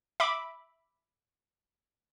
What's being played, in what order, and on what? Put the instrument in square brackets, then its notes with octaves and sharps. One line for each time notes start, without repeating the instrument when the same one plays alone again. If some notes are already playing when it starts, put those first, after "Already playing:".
[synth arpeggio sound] E5 B5 D6